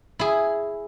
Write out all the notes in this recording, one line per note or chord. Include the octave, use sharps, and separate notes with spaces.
E4 G#4